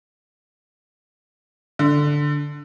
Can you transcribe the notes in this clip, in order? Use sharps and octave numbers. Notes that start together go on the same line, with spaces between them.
D3